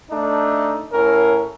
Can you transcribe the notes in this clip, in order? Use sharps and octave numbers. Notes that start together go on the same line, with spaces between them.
A3 D4 D#4
A2 C#4 A#4